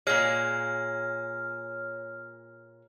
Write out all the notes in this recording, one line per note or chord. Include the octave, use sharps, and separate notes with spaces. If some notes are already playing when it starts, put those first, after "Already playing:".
A#2 G#3 C#5 F6